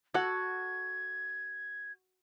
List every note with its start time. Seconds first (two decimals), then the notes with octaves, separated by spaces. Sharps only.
0.14 F#4 A4 F#5 G#6